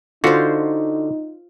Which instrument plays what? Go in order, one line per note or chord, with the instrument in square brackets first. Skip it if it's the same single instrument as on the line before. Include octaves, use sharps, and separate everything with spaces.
[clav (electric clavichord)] D3 F#4 [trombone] D#4 [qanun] F4 C5